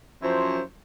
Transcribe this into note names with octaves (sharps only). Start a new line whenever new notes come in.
F#2 F3 E4 C5